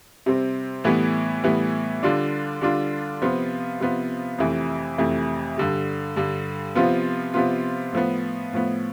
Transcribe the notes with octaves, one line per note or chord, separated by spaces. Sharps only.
C3 G3 C4
A2 E3 G3 B3
A2 E3 G3 B3
D3 G3 D4 F4
D3 G3 D4 F4
C3 F3 B3 F4
C3 F3 B3 F4
F2 C3 E3 A3
F2 C3 E3 A3
G2 D3 G3
G2 D3 G3
C3 F3 B3 F4
C3 F3 B3 F4
A2 F3 B3
A2 F3 B3